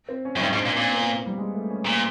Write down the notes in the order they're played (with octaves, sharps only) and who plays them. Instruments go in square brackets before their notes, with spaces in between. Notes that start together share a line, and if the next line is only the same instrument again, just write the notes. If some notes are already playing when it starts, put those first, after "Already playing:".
[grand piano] C4
C#4
[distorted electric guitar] F#2
[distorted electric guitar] G2 [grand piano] D#4
[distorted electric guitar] G#2
[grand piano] D4
[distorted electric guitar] A#2
[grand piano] C4
[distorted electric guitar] A#2
[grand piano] B3
C4
B3
A#3
G3
G#3
A3
C#4
[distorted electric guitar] A#2